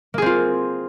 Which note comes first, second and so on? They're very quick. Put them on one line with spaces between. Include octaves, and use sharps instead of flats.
A#3 G#4 C4 F4